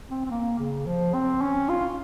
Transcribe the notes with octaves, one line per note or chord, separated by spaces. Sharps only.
C4
C4
A#3
C#3
F3
C4
C#4
F4